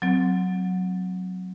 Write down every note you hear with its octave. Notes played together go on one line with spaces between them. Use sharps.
F#3 C4